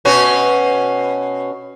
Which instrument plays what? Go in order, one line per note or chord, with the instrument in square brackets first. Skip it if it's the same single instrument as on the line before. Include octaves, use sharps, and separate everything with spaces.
[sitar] B2 C#4 F#4